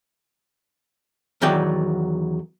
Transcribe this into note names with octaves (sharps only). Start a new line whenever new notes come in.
E2 D#3 F#3 D5 G5